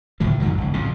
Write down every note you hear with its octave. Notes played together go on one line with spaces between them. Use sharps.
C#2 A2 D#3 F3
F2 G#2 D#3 F#3
G#1 C#2
F2 A2 C#3